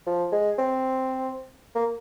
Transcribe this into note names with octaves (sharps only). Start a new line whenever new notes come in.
F3
G#3
C4
A#3